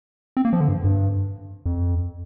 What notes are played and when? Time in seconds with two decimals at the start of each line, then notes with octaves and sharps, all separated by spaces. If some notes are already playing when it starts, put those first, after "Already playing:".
0.37 C4
0.45 A#3
0.53 F3
0.61 D3
0.68 G2
0.84 G2
1.66 F2